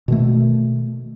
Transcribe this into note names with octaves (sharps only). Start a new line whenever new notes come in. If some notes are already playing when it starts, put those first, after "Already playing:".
B2 D#3 A3